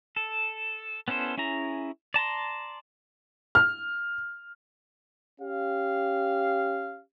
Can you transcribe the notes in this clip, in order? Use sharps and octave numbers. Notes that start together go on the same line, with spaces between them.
A4
B3 C#4 E4 A4 C5
C#4 E4 G#4 A#5
D5 A5 A#5 C6
F6
C#4 G4 F5